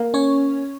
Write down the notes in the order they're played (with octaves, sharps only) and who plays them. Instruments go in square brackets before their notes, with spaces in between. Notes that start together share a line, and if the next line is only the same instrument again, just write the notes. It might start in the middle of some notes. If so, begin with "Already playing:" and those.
Already playing: [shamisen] A#3
[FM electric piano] C#4 C#5